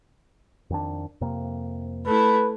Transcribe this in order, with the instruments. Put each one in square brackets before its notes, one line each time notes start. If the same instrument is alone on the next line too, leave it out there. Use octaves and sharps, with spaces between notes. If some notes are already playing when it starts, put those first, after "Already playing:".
[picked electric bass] F2 D#3 D4
F2 C3 A#3
[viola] A3 E4 [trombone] B4